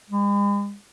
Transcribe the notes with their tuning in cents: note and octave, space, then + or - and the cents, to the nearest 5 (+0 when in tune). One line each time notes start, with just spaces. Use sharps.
G#3 -45